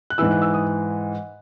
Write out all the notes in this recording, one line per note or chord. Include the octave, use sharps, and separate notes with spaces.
F#6
G#2 E3 E6
F#6
E6
D#6